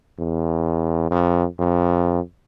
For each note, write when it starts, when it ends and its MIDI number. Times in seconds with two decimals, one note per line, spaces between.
0.19 1.09 40
1.11 1.45 41
1.59 2.20 41